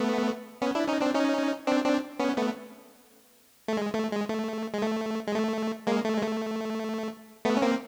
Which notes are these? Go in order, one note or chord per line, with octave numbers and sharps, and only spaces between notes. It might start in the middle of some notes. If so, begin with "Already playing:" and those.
Already playing: A3 B3
B3 C#4
D4 E4
C#4 D#4
C4 D4
C#4 D#4
C4 D4
C4 D4
B3 C#4
A3 B3
A3
G#3
A3
G#3
A3
G#3
A3
G#3
A3
G#3 A#3
A3
G#3
A3
A3 B3
C#4
A#3 C4